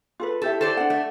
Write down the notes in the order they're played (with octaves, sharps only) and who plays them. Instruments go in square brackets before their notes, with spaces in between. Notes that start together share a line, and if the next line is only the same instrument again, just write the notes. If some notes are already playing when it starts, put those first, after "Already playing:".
[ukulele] F4 A4 B4
[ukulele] E4 G4 E5 [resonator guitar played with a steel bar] A4
[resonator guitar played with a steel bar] A4 C5 D5
[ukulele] D4 F#5
[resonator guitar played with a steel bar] A3